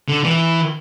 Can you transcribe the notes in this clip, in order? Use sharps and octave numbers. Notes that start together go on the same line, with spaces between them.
D3
E3